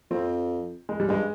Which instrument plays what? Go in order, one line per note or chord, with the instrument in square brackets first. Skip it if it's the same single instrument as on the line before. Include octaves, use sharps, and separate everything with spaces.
[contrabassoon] F2 [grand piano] C4
[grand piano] G#3
G3
[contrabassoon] G2 [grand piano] G#3